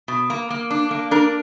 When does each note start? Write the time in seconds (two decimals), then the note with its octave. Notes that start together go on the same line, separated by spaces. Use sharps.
0.08 B2
0.30 A#3
0.50 A#3
0.70 D4
0.91 A#3
1.11 D4 A#4